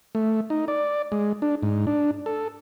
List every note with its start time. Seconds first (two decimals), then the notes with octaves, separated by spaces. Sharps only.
0.15 A3
0.50 D#4
0.68 D5
1.12 G#3
1.42 D4
1.63 G#2
1.87 D4
2.26 A4